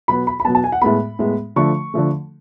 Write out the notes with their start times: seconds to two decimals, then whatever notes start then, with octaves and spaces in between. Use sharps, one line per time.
0.08 B2 F#3 B3 B5
0.27 B5
0.40 B5
0.45 B3 A5
0.48 B2 F#3
0.55 A5
0.64 G#5
0.72 F#5
0.82 A2 G#3 B3 B5
1.19 A2 G#3 B3
1.56 D3 F3 A3 C#6
1.94 D3 F3 A3